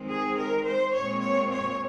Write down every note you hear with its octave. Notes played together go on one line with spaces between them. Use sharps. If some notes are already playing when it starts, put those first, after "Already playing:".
Already playing: D#3 G#3 C4
G#4
A#4
C5
A#2 G#3 C4 C#5
C#5
C#5